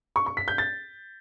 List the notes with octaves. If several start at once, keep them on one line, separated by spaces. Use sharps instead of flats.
C#6
C#6
B6
G6
A6